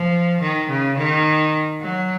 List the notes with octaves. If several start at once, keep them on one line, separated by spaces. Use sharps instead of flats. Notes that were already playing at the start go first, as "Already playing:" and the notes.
Already playing: F3
D#3
C#3
D#3
F#3